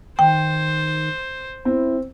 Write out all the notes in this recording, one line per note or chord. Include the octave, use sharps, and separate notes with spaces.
D#3 C5 G5
C4 E4